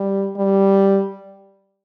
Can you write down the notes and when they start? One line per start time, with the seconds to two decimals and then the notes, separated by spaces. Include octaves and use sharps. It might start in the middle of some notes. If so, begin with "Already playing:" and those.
Already playing: G3
0.37 G3